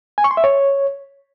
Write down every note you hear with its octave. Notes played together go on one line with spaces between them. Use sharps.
G#5
C#6
C6
E5
C#5